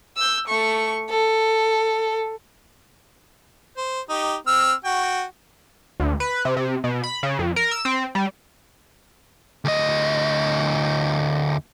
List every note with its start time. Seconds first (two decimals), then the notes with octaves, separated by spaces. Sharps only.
0.17 E6 G6
0.48 A3 C#6
1.10 A4
3.77 C5
4.10 D#4 G4
4.47 C4 E6 F6
4.85 F#4 G5
6.00 D2
6.20 B4
6.45 C3
6.57 C3
6.84 B2
7.04 B5
7.23 C#3
7.39 F2
7.56 A#4
7.71 E6
7.85 C4
8.15 G3
9.65 D2 D#5